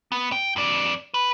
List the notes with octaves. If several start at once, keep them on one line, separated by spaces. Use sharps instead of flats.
B3
G5
F2 D5
B4